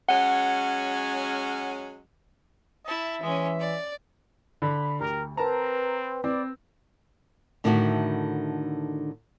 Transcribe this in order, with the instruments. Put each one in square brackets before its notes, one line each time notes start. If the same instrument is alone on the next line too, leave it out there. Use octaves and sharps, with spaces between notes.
[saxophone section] F#3 G#3 C#4 [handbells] F#5
[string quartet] E4 A5 [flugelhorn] E5
[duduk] E3 [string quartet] G#3 C#4
[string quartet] D5
[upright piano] D3 [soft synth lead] B5
[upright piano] D2 [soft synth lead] G4 [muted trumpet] A#4
[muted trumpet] C4 [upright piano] A#4 A5 A#5 [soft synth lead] B4
[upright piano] C4 [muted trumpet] D5
[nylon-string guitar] A2 D3 D#3 A3 E4 F#4